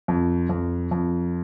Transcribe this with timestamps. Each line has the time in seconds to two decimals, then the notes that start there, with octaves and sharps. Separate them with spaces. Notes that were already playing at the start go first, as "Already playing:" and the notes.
0.08 F2
0.49 F2
0.91 F2